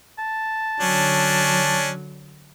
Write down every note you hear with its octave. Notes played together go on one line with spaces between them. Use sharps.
A5
D3 F#3 C#4 D4